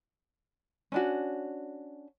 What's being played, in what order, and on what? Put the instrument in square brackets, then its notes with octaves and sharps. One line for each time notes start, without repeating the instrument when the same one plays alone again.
[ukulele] C#4 D4 F#4